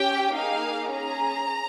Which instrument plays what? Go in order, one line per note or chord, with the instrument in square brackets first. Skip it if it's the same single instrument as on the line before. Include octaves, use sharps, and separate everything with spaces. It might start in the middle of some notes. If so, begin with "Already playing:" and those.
Already playing: [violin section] C#4 G4 G5
A#3 D#4 G#4 F5
C#4 G#4 A#5